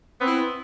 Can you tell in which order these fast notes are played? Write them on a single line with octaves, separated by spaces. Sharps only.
B3 C4 E4